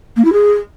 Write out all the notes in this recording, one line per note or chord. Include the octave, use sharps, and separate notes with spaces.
A#3
E4
G#4